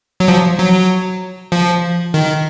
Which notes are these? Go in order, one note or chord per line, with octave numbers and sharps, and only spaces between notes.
F#3
F3
F#3
F3
D#3